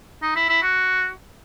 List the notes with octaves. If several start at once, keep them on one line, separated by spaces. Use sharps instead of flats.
D#4
E4
E4
F#4